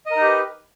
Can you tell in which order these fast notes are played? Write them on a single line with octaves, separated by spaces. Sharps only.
D#5 A#4 D#4 G4 B4